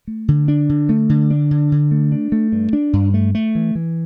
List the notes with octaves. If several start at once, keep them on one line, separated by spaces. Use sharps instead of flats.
A3
D3
D4
D3
A3
D3
D4
D3
D3
A3
D4
A3
G2
D4
G2
A3
A3
E3
E3